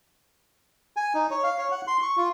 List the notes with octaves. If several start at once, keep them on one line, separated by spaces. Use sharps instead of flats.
G#5
D#4
C#5
F5
C#5
F#5
C6
C#6
F4